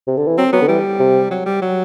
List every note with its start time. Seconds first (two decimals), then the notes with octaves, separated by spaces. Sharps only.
0.07 C3
0.17 D3
0.28 E3
0.38 F#3 C4
0.53 F#3 B3
0.62 D3
0.68 E3 G3
0.99 C3
1.31 F#3
1.46 G3
1.62 F#3